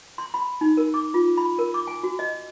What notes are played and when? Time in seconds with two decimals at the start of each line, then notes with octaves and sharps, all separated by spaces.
0.18 C6
0.34 B5
0.61 D#4
0.77 A#4
0.94 D6
1.14 F4
1.37 B5
1.59 A#4
1.74 D6
1.87 G#5
2.03 F#4
2.19 D#5